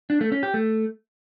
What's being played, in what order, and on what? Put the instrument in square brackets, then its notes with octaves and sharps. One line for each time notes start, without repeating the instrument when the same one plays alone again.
[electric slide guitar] D4
A3
C#4
G4
A3